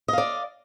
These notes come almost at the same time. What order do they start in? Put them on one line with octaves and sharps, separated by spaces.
D#5 F5 D5